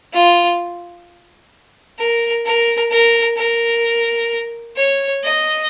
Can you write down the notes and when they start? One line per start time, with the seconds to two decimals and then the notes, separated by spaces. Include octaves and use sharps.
0.13 F4
1.98 A#4
2.45 A#4
2.91 A#4
3.37 A#4
4.76 C#5
5.23 D#5